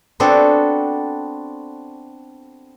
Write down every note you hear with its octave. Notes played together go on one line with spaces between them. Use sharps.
B3 C4 D4 F#4 A4